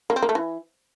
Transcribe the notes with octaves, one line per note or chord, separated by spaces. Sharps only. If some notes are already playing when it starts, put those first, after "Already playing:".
A#3
C4
A#3
A3
E3